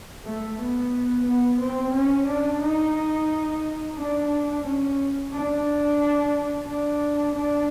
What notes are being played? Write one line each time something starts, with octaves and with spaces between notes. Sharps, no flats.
A3
B3
B3
C4
C#4
D4
D#4
D4
C#4
D4
D4
D4